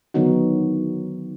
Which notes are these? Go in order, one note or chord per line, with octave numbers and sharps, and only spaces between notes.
D3 D#3 F#3 B3 D#4 F#4